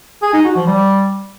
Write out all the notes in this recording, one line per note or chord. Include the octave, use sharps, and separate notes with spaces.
G#4
D#4
F#4
F3
G3